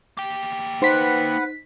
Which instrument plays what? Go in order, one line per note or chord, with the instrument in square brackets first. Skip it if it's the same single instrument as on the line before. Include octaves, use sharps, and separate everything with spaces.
[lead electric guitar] A#3 G5
[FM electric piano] D#4 B6 [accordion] B4 F#5 [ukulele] C5